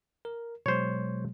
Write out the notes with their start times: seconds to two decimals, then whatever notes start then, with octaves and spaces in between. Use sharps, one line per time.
0.25 A#4
0.66 B2 F#3 G#3 C5 C#5